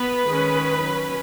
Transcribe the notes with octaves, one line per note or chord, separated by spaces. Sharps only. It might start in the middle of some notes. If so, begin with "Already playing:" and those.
Already playing: B3 B4
D#3 G#3 C#4
F#3 C#4